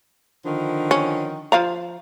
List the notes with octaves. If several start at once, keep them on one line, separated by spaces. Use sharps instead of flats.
D3 D#3 F3
C#4
F3 F5 A#5